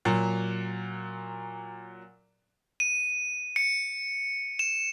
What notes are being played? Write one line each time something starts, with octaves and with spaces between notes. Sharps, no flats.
A#2 F#3
D#7
C#7
E7